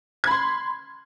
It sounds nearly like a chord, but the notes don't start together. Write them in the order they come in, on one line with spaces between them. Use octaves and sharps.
G#6 B5 C6